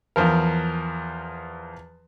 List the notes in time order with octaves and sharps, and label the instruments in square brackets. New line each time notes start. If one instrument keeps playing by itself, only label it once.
[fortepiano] E2 F3 A#4